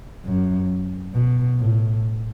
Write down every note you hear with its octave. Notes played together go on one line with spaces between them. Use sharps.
F#2
B2
A2